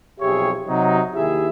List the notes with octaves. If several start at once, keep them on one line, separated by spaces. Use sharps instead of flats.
B1 F2 G4 G#4 C#5 E5
C3 F#3 D#4
D#2 E4 G4 G#4 E5